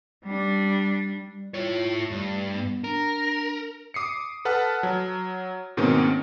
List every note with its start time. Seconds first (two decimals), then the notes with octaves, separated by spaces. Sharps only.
0.25 G3 D4
1.29 G3
1.54 E4 F4 C#5
2.11 G2 A3
2.55 B3
2.84 D4 A#4
3.94 D6 D#6 C7 C#7
4.45 A4 B4 F#5 A5 F6
4.83 F#3
5.77 G#2 B2 D#3 A#3 C4 C#4